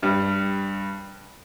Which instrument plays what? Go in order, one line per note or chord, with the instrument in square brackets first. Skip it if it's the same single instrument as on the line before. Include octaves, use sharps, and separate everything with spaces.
[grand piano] G2 G3